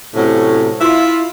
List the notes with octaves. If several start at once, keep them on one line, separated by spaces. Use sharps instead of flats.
A2 C3 F#3 A3 C#4
E4 F4